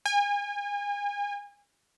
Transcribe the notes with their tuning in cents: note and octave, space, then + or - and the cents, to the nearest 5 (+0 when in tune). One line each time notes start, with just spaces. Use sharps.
G#5 -35